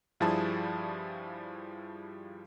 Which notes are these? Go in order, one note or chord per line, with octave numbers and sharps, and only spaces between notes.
G2 F3 G3 E4 G#4 A5